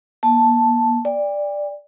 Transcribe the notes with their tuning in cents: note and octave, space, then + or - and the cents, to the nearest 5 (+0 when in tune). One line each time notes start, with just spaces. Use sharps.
A#3 +40 A5 +0
D5 +0 G5 +40